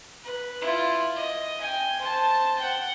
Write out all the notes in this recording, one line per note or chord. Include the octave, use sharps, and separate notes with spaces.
B4
E4 F4
D#5
G5 G#5
C5 A5
F#5 G5